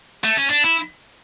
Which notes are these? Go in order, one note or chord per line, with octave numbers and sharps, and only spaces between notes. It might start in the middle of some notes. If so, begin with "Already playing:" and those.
A3
C#4
D4
E4